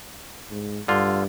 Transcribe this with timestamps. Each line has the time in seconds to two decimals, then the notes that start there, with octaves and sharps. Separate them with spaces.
0.51 G#2
0.88 G2 D3 F4